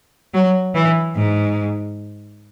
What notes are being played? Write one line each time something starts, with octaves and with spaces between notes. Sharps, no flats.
F#3
E3
G#2